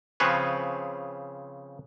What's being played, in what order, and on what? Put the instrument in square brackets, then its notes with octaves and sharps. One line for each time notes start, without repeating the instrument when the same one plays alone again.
[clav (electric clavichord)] C#3 F3 C4 G#4 B4 C#5